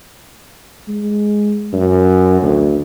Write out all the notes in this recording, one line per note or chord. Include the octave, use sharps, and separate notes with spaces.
G#3
F#2
D2